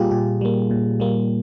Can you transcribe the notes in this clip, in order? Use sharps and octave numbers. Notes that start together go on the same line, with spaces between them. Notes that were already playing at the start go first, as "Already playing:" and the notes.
Already playing: A#2 G3 A#3 F4 G4 G#4
A#2 G4
G3 A#3
A#2
G3 A#3